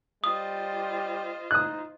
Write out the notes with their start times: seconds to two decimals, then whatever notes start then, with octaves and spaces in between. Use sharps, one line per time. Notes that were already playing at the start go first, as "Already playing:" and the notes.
0.24 G3 F4 C5 D#5 D#6
1.51 D#4 D#6 F#6